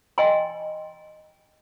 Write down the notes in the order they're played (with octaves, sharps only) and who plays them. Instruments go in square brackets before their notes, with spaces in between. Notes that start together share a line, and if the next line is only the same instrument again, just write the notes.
[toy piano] D#5 G5 G#5 C6